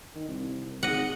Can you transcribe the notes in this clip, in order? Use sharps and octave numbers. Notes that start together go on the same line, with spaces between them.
D#3
C2
G#1 D#5 F#5